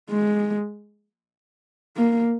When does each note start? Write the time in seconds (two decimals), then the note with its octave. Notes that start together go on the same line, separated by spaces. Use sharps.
0.10 G#3
1.97 A#3